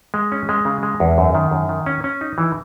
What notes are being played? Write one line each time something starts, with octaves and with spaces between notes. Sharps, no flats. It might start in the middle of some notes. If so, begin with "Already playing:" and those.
G#3
C#4
G#3
C#3
G#3
E2
F#2
D#3
F#2
D#3
C#4
C#4
D#4
E3